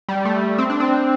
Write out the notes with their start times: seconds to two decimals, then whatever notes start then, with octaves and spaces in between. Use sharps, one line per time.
0.09 G3
0.25 A3
0.58 C4
0.70 D4
0.80 C4